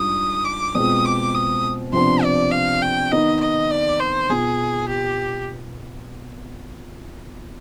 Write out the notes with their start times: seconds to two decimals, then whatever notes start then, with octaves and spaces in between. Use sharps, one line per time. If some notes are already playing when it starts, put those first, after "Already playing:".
Already playing: G#2 G3 D4 F4 D#6
0.45 D6
0.74 B2 G#3 C4 F4 D#6
1.05 D6
1.35 D#6
1.92 C3 F3 B3 D4 C6
2.23 D5
2.52 F5
2.82 G5
3.11 D#3 B3 D#4 D#5
3.40 D#5
3.71 D5
4.00 C5
4.29 B2 B3 F4 G#4
4.88 G4